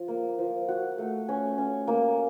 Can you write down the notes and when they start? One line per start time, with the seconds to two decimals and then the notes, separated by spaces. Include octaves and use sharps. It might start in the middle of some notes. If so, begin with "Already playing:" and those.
Already playing: F3
0.08 A#3
0.38 F3
0.68 F#4
0.98 A3
1.29 C#4
1.58 C#4
1.88 A#3